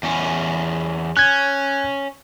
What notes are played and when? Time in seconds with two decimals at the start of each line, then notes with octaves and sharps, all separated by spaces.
0.03 E2 C#4
1.17 C#4 F#6 G#6